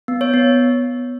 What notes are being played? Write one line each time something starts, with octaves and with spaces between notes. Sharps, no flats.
B3
C#5
B3